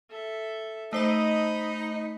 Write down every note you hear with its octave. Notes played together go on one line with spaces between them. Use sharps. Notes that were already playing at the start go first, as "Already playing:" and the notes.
A4 E5
A3 D#4 C5 D#5 A5 B5